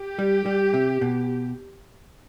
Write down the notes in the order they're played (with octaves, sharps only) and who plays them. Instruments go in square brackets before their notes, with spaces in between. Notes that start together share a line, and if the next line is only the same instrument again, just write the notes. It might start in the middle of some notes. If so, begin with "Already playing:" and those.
Already playing: [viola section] G4
[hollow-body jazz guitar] G3
G3
C3
B2